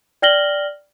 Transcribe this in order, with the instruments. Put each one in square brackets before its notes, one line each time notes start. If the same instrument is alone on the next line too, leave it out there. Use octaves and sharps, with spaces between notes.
[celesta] D5 G5 F6 A#6 F#7 G7